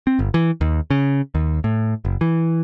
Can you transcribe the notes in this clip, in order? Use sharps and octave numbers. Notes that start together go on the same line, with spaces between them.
C4
G1
E3
D#2
C#3
D#2
A2
F#1
E3